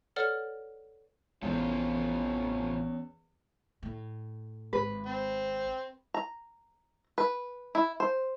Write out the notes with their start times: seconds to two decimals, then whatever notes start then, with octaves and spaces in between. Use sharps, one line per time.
0.16 A4 B4 C#5 D5 F#5 F6
1.43 A1 E2 A3 C4 C#4 F4
3.83 A2
4.73 G#1 B4
5.06 C4
6.14 A#5
7.18 B4
7.75 E4
8.00 C5